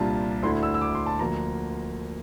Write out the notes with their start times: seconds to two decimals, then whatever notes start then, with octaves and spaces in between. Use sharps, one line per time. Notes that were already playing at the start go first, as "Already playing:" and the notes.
Already playing: C2 A#2 G3 D4 F4 A5
0.43 D2 D3 A3 E4 C6
0.63 E6
0.74 E6
0.81 D6
0.95 C6
1.06 A5
1.19 D2 D3 F3 A#3 A#5